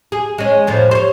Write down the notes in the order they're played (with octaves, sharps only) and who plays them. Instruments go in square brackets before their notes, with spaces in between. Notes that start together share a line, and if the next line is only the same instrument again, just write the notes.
[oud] G#4
G#3 C#4
F2 A2 F3
C5 C#5